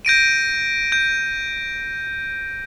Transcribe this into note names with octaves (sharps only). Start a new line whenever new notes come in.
G6 A#6 D7 D#7
G6